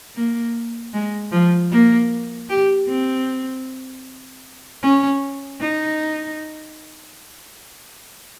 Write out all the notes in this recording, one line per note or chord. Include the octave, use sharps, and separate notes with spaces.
A#3
G#3
F3
A#3
G4
C4
C#4
D#4